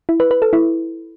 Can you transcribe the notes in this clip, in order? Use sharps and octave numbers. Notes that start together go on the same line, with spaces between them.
E4
B4
B4
A4
E4